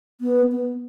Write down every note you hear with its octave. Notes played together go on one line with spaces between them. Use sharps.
B3
B3